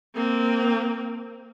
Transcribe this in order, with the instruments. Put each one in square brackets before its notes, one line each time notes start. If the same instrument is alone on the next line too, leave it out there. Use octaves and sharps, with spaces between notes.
[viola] A#3 C4